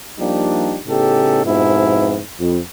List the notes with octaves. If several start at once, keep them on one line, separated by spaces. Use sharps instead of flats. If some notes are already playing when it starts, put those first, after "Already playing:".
F3 G3 A#3 D4 D#4 G4
A2 C#3 B3 D#4 G4 A4
F2 G#2 B2 F3 B3 E4
F2